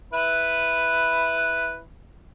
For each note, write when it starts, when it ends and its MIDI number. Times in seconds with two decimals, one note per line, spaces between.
0.13 1.80 64
0.13 1.80 71